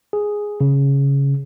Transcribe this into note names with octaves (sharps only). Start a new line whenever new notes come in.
G#4
C#3